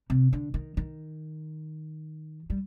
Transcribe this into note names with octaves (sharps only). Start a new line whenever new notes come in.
C3
D3
D#3
D#3
G3